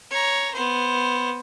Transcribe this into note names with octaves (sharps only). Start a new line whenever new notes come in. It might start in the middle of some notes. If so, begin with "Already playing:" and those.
C#5 A#5
B3 C5